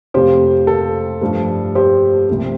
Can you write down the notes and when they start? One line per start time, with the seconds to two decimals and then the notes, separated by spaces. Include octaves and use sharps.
0.14 F2 C3 A3 F4 G4 C5
0.67 A4
1.21 G2 F3 A3
1.75 G4 C5
2.29 C2 C3 F3 A3 C4